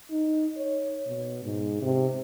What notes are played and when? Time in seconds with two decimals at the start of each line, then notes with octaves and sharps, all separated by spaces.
0.11 D#4
0.57 C#5
1.07 B2
1.44 G#2
1.82 C3